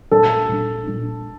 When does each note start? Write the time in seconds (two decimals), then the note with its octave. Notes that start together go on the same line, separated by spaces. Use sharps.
0.11 A#2 G3 D4 A4
0.49 A#2 G3 D4
0.87 A#2 G3 D4